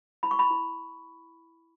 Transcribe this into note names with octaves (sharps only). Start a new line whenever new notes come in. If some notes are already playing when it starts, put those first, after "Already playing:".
E4 B5
C#6
B5
E4